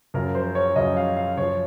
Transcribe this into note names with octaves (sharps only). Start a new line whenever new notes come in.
F#2 C#3 F3 A#4
C5
C#5
F#2 C#3 F3 D#5
F5
F5
F#2 F3 C#5